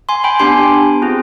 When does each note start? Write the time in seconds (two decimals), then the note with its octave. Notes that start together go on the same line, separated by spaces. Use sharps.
0.09 G#5 C6
0.24 G5 B5
0.39 B3 D4 G4 G#5 C6
1.02 C4 F4 G#4